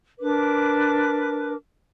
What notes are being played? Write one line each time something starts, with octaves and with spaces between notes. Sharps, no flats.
D4 A#4 B4 D6